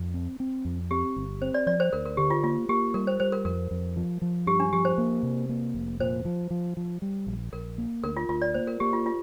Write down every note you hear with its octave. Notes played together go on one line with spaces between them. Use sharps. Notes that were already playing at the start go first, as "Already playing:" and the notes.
Already playing: F2
C4
C4
F2
C4 G4
G1
C4 C5
D5
F3 D5
C5
D2 A#4
A#4
D3 G4
F4
A#3 F4
A#3 G4
G3 A#4
C5
G3 C5
A#4
F2 A#4
F2
F3
F3
G2 G4
D4
F3 G4
C5
A#3
C3
A#3
F1
A#2 C5
F3
F3
F3
G3
A#1
A#1 A#4
A#3
D2 A#4
F4
D2 F4
D5
A#3 C5
A#4
A#3 G4
F4
F4